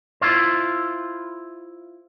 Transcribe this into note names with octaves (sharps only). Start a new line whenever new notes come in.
E4 F4 C5